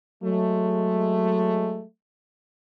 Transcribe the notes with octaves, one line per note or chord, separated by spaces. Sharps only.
F#3 G#3 A3